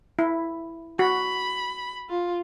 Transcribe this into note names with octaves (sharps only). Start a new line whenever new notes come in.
E4
F#4 B5
F4